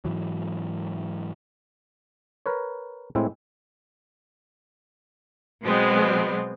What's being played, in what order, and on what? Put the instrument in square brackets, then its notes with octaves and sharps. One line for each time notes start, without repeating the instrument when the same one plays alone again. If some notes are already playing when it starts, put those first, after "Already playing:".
[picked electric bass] G#2 E3 F#3
[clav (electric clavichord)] A#4 B4 C#5
A2 G#3 C4 E4
[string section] B2 F#3 G#3 B3 C4